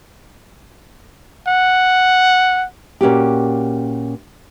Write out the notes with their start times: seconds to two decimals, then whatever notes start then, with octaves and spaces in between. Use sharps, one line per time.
1.48 F#5
3.01 A#2 C#4 F#4 G4